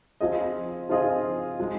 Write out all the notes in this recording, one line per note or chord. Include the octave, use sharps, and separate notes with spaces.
F3 C4 F4 G#4 D#5
F3 C4 F4 G#4 D#5
F3 G#3